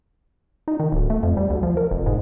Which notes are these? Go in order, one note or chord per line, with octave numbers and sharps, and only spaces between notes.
D#4
D#3
D1
A3
F2
G3
D2
F3
A#4
F1
G#2